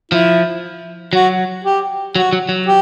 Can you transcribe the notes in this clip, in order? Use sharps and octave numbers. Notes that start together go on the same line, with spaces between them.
F3 E4
F#3 F#4
G4
F#3 F#4
F#3
F#3
G4